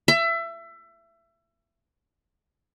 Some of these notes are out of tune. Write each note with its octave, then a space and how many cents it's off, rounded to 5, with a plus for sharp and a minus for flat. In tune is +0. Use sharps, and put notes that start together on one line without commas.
E5 +25